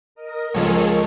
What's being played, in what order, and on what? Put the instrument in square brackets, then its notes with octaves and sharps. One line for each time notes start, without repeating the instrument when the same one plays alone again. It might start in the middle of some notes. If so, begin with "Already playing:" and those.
[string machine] A#4 D#5
[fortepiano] C#2 F3 [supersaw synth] G#4 A4 C#5